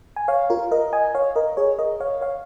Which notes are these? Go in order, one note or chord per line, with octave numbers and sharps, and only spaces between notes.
G#5
C#5 F5
F4 A#4
A#4 D#5
D#5 G#5
C#5 F5
A#4 D#5
G#4 C#5
A#4 D#5
C#5 F5
C#5 F5